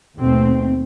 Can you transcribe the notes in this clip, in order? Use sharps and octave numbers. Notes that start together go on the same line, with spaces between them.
D#2 B2 A3 C4